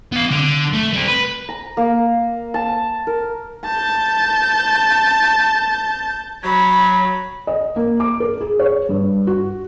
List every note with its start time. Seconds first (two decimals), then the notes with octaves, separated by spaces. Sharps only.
0.12 B3 F5
0.31 D3
0.73 A3
0.93 G3 C4
1.08 B4
1.49 A#5
1.77 A#3
2.54 A5
3.07 A#4
3.65 A5 G6
6.44 F#3 C#5 B5
7.47 D#5
7.76 A#3
8.00 D6
8.20 A#4
8.41 G#4
8.59 C#5
8.89 G2
9.27 F#4